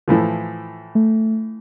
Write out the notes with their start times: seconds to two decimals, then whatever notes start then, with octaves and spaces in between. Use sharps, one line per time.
0.08 A2 E3 F3
0.95 A3